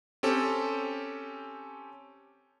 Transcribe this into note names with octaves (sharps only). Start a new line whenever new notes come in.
C4 C#4 G4 A4